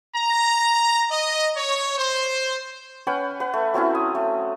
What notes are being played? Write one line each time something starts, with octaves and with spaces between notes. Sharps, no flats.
A#5
D#5
C#5
C5
C#4 B4 F#5 G5
B4 F#5
A3
F#3 C4 C#4 E4
D#6
A3